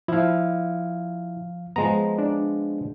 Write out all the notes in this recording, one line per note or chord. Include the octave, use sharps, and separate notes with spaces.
F3 E4 F5
F3 G#3 B3 A#5
D4